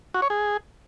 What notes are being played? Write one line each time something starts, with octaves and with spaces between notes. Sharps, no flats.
F#4
C#5
G#4